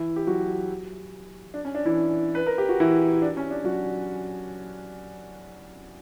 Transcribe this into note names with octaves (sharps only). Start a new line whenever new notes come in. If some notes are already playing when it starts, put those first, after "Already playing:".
Already playing: E3 E4
G4
F#3 F#4
D4
C#4
D4
E3 E4
B4
A#4
G4
F#4
E3 E4
D4
C#4
D4
F#3 F#4